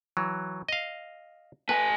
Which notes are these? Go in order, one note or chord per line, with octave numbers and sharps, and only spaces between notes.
E3 F#3
D#5 F5
A3 B4 G#5